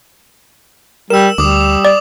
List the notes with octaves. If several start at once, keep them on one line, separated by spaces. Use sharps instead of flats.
G3 A#4 E6 E7
D2 G3 D6 D#6
D5 D6